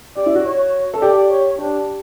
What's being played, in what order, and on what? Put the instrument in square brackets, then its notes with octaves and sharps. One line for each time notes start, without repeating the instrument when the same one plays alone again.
[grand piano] G4 [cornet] D5
[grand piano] E4
F#4
[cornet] C#5
[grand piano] A4
[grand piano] G4 [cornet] D5
[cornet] C#5
[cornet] D4 [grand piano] G4